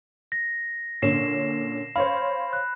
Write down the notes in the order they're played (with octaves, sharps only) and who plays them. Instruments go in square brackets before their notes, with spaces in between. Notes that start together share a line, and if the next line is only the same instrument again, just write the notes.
[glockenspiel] A#6
[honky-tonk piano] A#2 D3 C#4 [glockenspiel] C7 E7
[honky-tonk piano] C5 C#5 F5 [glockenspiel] B5
[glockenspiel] F#6